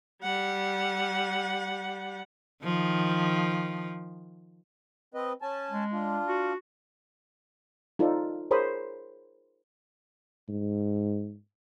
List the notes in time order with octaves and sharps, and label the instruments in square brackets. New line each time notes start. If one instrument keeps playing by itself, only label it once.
[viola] G3 F#5
[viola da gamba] D#3 F3
[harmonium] C4 B4 D#5
C#4 G#5 A5
[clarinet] G#3
[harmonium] D4 F4
[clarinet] F#4
[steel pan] D#4 F4 A4 C5 D5
G#4 A#4 C5 C#5 B5 D#6
[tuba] G#2